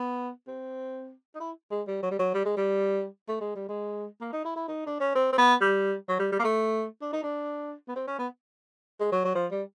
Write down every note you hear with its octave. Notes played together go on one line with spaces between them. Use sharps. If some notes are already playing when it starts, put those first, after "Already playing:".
Already playing: B3
C4
D#4
E4
G#3
G3
F#3
G3
F#3
G3
G#3
G3
A3
G#3
G3
G#3
A#3
D#4
E4
E4
D#4
D4
C#4
C4
C4
B3
G3
F#3
G3
G3
A#3
A3
D4
D#4
D4
B3
C4
C#4
B3
G#3
F#3
F#3
F3
G3